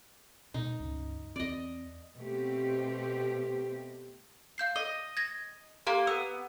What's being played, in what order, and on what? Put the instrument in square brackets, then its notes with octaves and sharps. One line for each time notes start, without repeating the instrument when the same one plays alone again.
[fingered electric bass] B2 G#3 [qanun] D#4
[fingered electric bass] C#2 G2 C#3
[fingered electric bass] E2 C4 [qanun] D5 D#5
[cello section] B2 A3 C4 G4
[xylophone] F5 G6 C7
[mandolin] D#5
[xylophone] G#6 A#6
[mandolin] A#3 [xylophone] G4 F5 A#5
[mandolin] B3 [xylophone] E6